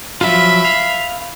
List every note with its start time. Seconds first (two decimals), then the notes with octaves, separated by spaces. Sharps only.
0.21 F3 F#3 F4 E5 B5
0.65 F5